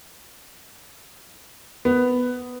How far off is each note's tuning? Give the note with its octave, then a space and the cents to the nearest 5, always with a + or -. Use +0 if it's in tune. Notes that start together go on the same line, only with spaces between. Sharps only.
B3 +10